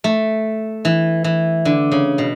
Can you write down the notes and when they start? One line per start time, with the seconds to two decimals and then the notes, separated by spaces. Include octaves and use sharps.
0.04 A3
0.85 E3
1.24 E3
1.65 D3
1.91 C#3
2.18 B2